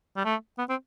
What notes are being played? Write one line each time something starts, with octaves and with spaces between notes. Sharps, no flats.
G3
A3
B3
C4